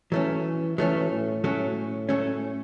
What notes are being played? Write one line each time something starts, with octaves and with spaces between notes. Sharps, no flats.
E3 F#3 A3 C#4
E3 F#3 A3 C#4
A2
A2 F#3 A3 C#4
F#3 A3 C#4